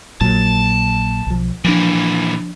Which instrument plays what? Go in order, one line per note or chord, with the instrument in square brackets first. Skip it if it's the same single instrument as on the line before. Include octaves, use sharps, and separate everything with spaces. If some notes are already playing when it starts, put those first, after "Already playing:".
[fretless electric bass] A#1 A#2 F#3 [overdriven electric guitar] A5
[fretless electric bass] B1 F3
[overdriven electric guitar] A#2 E3 [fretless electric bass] F3 D4